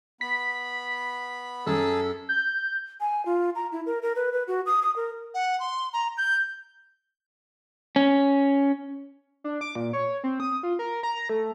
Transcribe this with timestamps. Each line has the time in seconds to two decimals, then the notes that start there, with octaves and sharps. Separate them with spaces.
0.21 B3 B5 B6
1.67 F#2 G#4 A4 A5
2.29 G6
3.01 G#5
3.26 F4
3.55 A#5
3.72 E4
3.86 A#4
4.02 A#4
4.16 B4
4.32 B4
4.47 F#4
4.66 D#6
4.82 D#6
4.96 A#4
5.34 F#5
5.60 C6
5.93 A#5
6.18 G6
7.96 C#4
9.44 D4
9.61 D6
9.75 A#2
9.93 C#5
10.24 C4
10.40 D#6
10.63 F4
10.79 A#4
11.03 A#5
11.29 A3